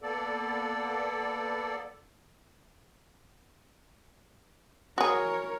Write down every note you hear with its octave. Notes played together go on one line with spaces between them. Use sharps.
A#3 B3 A4 D5
F#4 G#4 A#4 C#5